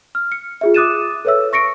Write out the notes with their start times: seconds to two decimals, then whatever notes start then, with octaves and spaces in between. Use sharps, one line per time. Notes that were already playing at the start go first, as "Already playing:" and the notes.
0.15 F6
0.32 C#7
0.61 F4 G#4 E5
0.74 D6 D#6 F#6 A6 D#7 E7
1.25 A4 B4 C#5 E5 E6
1.53 C#6 A#6 C#7 D7